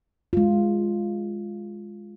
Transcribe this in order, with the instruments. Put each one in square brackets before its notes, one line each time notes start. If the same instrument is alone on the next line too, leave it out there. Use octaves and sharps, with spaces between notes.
[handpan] G#3 F4